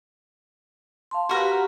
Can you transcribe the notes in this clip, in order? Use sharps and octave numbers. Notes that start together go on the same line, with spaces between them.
F5 A5 C6
F#4 G4 A#4 B4